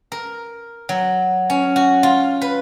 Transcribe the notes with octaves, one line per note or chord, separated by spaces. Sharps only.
A#4
F#3
C#4
F#4
F4
B4